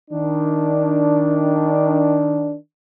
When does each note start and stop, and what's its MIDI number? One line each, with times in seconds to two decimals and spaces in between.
0.11 2.55 51
0.11 2.55 62